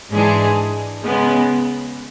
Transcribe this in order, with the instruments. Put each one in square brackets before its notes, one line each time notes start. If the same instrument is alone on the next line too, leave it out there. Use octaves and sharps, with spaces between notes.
[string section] G#2 E3 G#3 D4 G#4
C#3 G#3 B3